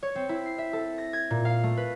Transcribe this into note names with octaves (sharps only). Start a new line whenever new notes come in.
C#5
C4
E4
C7
E5
A4
A#6
G#6
A#2
F5
A3
B4